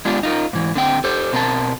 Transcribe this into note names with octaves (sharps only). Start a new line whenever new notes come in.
G#3 B3 D4 F4 G4
D#4 F4 A#4
G#2 E3
D3 C4 G5
G4 A4 C5
B2 C4 A#4 C5 A5